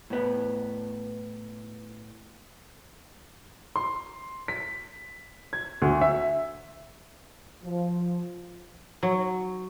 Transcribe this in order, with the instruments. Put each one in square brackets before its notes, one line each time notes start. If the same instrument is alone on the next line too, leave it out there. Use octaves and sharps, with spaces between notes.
[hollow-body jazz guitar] A2 B3
[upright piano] C6
B6
G#6
D2
E5
[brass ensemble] F3
[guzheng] F#3